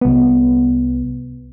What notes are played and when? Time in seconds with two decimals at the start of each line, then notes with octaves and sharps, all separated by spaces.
0.01 C2 B3